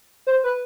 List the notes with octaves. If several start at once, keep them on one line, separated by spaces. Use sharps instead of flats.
C5
B4